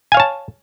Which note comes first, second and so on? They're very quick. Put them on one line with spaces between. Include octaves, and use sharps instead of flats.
G#5 F5 C#5 A5